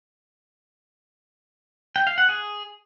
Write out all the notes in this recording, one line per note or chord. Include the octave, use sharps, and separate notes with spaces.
G5
F5
F#5
G#4